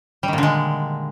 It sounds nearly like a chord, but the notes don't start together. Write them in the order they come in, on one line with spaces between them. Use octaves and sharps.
G3 D#3 A#2 D3 G#3